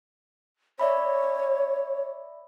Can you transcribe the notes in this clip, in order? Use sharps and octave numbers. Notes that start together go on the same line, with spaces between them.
C#5 D5 E5 B5